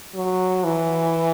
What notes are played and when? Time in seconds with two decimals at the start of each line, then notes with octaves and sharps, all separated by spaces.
0.15 F#3
0.64 E3